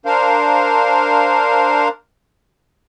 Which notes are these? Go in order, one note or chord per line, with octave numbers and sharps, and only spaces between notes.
D4 A#4 C5 F5